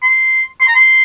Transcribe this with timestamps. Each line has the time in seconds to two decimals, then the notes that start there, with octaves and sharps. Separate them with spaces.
0.02 C6
0.61 C6
0.68 A#5
0.75 C6